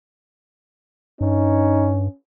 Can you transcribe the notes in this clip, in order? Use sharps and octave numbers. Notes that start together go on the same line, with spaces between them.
G2 C#4 D#4